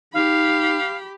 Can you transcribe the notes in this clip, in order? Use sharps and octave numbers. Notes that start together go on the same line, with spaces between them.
D#4 G4 F5 B5